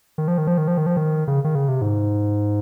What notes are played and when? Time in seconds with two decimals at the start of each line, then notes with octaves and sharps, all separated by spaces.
0.18 D#3
0.28 F3
0.38 D#3
0.47 F3
0.58 D#3
0.68 F3
0.77 D#3
0.86 F3
0.97 D#3
1.28 C#3
1.44 D#3
1.55 C#3
1.68 C3
1.82 G#2